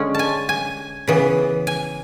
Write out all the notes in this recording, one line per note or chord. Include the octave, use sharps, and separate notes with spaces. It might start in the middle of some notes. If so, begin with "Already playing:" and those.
Already playing: D3 G#3 C#4
G#5 A5
G#5
C#3 E3 B3
G#5